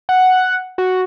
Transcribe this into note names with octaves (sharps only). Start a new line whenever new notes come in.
F#5
F#4